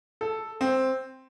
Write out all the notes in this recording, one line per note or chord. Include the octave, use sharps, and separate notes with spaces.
A4
C4